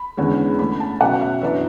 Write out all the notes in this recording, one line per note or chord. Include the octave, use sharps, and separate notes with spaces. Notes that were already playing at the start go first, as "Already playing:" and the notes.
Already playing: B5
E2 D3 G#3 C#4
D3 A3 C#4 B5
A5
B2 F#3 C#4 F#5
E5
F#2 E3 B3 D4 E5